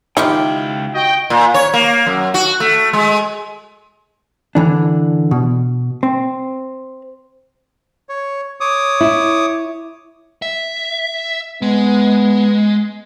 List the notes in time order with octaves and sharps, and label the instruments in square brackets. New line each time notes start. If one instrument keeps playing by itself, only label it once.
[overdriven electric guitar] C#2 G5 [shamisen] D#3 [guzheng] E4 F4 G4
[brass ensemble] F#4 D#5 G5
[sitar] A#2
C#5
A#3
F#2
F#4
A3
G#3
[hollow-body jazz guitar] D3 E3 D4
B2
C4
[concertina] C#5
C#5 D6 D#6
[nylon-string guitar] E4
[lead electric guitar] E5
[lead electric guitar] G#3 [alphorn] B3